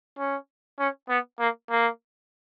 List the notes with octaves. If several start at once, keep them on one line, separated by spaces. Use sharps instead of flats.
C#4
C#4
B3
A#3
A#3